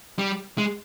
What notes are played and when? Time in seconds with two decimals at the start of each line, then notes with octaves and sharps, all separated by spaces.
0.19 G3
0.58 G#3